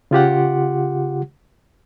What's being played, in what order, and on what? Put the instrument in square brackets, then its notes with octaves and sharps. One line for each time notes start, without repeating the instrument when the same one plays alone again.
[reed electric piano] C#3 F4 G4 F#5